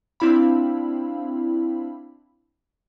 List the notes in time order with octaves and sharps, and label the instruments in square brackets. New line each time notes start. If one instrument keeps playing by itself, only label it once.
[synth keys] C4 D4 E4 F5 B5